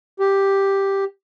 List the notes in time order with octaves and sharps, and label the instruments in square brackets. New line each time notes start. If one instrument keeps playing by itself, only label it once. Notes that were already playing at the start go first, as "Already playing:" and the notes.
[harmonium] G4